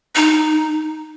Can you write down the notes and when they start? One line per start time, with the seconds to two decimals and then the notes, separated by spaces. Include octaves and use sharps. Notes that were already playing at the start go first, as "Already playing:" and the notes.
0.15 D#4